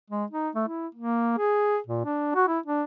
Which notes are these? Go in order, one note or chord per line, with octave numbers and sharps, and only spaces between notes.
G#3
D#4
A3
E4
A#3
G#4
A#2
D4
F#4
E4
D4